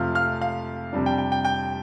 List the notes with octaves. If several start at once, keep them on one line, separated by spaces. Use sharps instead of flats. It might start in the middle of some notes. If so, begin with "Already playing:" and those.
Already playing: F2 C3 F3 A3 F5 F6
F5 F6
F5
F2 C3 G3 D4
G5
G5
G5
G5 G6